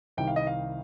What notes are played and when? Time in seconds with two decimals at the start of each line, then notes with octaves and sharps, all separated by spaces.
0.17 C2 C3 D#3 G3 G5
0.27 F5
0.36 D#5
0.47 F5